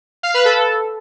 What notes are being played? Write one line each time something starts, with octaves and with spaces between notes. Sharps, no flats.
F5
B4
A4